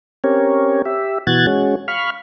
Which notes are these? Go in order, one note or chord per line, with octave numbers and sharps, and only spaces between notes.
C4 C#4 G4 A#4 C#5
G4 E5
B2 E3 F#4 F#6 G#6 A6
G#3 C#4 F#4
F5 B5 C#6 F6